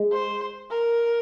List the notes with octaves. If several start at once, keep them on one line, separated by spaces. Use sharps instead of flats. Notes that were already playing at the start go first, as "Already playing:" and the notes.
Already playing: G#3
C5
A#4